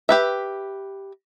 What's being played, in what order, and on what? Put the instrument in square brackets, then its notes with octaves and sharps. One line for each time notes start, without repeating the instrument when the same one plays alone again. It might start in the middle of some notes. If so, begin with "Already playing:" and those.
[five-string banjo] G4 B4 E5